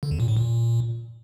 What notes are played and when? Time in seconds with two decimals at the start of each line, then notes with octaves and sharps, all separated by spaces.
0.03 D3
0.11 E2
0.20 A#2
0.28 A2
0.37 A#2